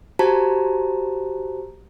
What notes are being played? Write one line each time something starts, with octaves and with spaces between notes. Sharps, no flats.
F#4 G4 C5 A5 A#5